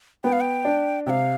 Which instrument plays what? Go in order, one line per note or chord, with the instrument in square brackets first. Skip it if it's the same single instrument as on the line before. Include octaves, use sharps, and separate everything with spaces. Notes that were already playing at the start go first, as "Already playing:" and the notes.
[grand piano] B3 [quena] G5
[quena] F5
G5
[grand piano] D4
[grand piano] C3 [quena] F5 G5